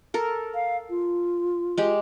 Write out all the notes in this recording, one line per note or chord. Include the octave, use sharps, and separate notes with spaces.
A4 A#4
F5
F4
G#3 G4